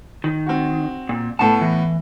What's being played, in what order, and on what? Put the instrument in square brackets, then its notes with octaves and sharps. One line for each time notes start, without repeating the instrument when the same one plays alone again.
[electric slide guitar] D#3
[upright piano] C4 F#4
[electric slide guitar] A#2
[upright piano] A2 B3 [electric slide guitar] A5
[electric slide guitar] E3